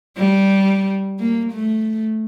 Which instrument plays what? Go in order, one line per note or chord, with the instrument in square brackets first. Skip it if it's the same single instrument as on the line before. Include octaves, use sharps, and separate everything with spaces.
[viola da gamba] G3
A#3
A3